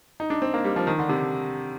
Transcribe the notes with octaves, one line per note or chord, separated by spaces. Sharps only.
D#4
D4
C4
A#3
G3
F3
D#3
D3
C3